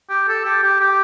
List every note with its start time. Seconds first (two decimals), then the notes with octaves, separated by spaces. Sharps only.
0.09 G4
0.28 A4
0.45 G4
0.63 G4
0.81 G4